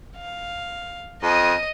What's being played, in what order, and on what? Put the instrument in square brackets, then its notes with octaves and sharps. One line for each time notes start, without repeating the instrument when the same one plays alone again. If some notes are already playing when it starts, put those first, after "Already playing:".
[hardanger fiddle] F5
[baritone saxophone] F2 [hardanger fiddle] D#5 D#6